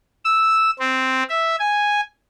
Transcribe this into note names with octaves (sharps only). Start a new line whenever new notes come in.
E6
C4
E5
G#5